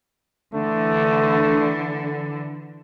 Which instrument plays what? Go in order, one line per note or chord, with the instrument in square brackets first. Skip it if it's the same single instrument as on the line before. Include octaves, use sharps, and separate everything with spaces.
[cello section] D3 E3 [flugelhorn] A3